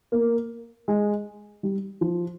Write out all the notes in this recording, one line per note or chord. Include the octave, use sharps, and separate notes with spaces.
A#3
G#3
G3
F3